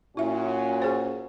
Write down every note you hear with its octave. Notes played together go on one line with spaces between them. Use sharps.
A#2 C#4 E4 F#4 E5
G#4 C5